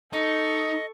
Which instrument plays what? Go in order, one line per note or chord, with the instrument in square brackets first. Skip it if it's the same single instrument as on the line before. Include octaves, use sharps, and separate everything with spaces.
[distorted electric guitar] D#4 [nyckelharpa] A4 C#6 [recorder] D#5